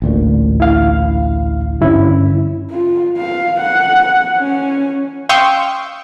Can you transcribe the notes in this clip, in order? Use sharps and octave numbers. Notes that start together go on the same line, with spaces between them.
A1 D2 A#2
E4 F5
G2 D3 C#4 E4
F4
F5
F#5
C#4
F5 G5 C6 C#6 D#6 E6